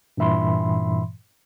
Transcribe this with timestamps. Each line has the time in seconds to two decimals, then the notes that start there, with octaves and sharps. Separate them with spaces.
0.17 G2 A#2 E3 E5 B5 C6